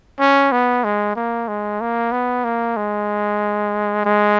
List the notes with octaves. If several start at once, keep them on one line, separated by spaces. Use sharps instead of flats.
C#4
B3
G#3
A#3
G#3
A#3
B3
A#3
G#3
G#3